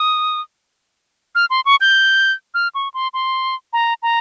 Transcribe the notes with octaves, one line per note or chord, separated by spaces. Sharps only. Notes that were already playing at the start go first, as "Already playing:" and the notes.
Already playing: D#6
F6
C6
C#6
G6
F6
C#6
C6
C6
A#5
A#5